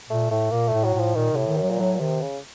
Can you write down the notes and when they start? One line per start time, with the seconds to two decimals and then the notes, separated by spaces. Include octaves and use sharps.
0.10 A#2 A3
0.30 A2 A3
0.51 A#2 A#3
0.68 A3
0.73 A2
0.84 F#3
0.94 A2
0.99 F3
1.16 A#2 D#3
1.31 A2 C3
1.47 D#3
1.57 F#2
1.63 F#3
1.70 A#2
1.79 A2 F#3
1.95 A#2
2.00 C3 D#3
2.22 C#3